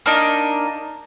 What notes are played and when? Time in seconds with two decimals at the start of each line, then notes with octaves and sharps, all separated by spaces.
0.06 A#3 D4 D#4